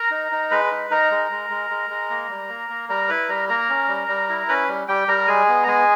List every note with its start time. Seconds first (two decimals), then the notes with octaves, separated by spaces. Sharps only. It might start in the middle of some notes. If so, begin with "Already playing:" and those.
Already playing: A#4 A#5
0.11 D#4
0.32 D#4
0.51 G#3 B4 B5
0.71 D#4
0.90 D#4 A#4 A#5
1.11 G#3
1.31 G#3
1.50 G#3
1.70 G#3
1.90 G#3
2.10 A#3
2.29 G3
2.49 A#3
2.70 A#3
2.89 G3 A#4 A#5
3.09 E4 B4 B5
3.29 G3 A#4 A#5
3.49 A#3 A#4 A#5
3.69 C#4
3.88 G3
4.08 G3
4.29 E4
4.48 C#4 B4 B5
4.69 G3
4.88 G3 G4 G5
5.08 G3 A#4 A#5
5.27 G#3 G#4 G#5
5.48 B3
5.63 A#5
5.68 G#3 G#4 G#5